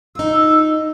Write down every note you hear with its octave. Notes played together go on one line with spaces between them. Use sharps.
D#4 F4 E6